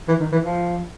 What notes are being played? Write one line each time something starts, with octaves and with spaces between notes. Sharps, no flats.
E3
D#3
E3
F3